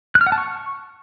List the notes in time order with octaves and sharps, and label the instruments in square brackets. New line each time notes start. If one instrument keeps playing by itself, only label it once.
[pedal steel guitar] F#6
F6
F#5
A5
C#6